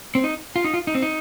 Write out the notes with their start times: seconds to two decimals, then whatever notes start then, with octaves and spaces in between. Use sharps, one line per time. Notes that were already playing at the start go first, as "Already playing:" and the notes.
0.15 C4
0.24 D#4
0.56 F4
0.64 D#4
0.74 F4
0.87 D#4
0.95 C4
1.02 D#4